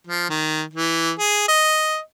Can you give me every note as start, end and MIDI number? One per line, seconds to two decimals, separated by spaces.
0.07 0.29 53
0.30 0.63 51
0.74 1.12 52
1.19 1.45 68
1.48 1.99 75